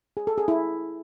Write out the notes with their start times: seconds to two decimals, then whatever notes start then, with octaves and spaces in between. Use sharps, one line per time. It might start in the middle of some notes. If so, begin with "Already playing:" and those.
0.17 G#4
0.27 A4
0.38 G#4
0.48 E4